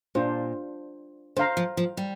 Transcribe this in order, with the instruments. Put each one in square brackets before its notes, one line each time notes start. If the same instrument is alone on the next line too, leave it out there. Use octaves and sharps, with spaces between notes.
[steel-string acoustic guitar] A#2 [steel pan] D4 F4 C5
[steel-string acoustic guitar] D3 [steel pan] C5 F5 A#5
[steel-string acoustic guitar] F3
F3
G3